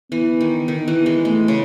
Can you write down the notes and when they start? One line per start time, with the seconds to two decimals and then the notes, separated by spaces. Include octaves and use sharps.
0.12 E3 B3
0.41 D#3
0.68 D#3
0.88 E3
1.06 G#3
1.24 G#3 A3
1.48 C#3